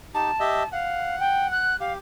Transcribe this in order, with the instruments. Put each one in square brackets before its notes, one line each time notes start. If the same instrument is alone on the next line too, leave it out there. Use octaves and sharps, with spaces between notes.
[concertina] D#4 G4 [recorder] A5
[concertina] G4 D#5 E5
[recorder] F5 [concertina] F#5
[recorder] G5
F#6
[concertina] G4 [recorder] F5